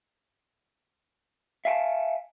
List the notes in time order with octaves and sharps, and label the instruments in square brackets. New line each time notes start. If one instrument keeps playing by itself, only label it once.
[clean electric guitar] E5 F5 G#5 A5